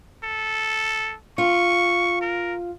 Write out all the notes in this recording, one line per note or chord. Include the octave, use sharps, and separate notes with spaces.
A4
F4 C#6
A#4